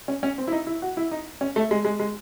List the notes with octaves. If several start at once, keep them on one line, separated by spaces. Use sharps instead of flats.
C#4
C#4
C4
E4
D#4
E4
F#4
E4
D#4
C#4
A3
G#3
G#3
G#3